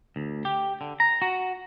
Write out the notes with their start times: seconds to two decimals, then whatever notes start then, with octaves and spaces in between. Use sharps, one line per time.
0.16 D2
0.45 G4
0.81 D3
1.00 A#5
1.22 F#4